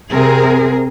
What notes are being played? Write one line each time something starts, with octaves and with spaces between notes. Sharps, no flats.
C3 C4 G#4 A#4